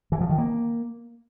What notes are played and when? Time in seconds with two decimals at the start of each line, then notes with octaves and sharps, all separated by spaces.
0.12 E3
0.21 F3
0.29 D#3
0.38 A#3